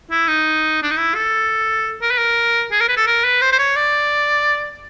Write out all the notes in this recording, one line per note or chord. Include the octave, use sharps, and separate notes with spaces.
E4
D#4
D4
D#4
E4
A4
A#4
B4
A#4
G#4
A#4
B4
A4
A#4
B4
C5
C5
C#5
D5